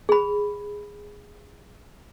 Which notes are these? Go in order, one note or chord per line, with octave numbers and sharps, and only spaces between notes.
G#4 B5